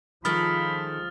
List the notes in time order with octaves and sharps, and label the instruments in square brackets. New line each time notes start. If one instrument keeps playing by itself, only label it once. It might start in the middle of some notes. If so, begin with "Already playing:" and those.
[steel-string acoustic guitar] D#3 G#3 A4 [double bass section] F3 [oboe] B5 [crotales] D#6 F6 A6